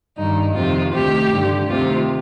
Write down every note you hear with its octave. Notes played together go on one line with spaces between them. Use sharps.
G2 D#3 D#4
F2 C3 D#3 F4
D2 C3 D#3 G4
G2 D3
D2 C3 D#3 F4